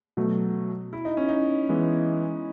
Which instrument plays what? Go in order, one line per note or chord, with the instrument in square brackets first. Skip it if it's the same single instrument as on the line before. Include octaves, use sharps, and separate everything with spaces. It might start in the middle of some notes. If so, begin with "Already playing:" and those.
[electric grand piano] B2 F#3 A3
[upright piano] E4
D#4
C#4
D#4
[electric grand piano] E3 G#3 B3 E4